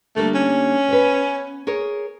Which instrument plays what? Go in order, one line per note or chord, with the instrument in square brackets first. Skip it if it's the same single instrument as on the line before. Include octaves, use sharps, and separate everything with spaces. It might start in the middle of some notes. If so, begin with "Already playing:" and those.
[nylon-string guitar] D3 G3 A#3 [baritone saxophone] A3
[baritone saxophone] C#4
[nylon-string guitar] B3 B4
G#4 A#4 C#5